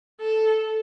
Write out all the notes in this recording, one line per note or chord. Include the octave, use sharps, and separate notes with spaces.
A4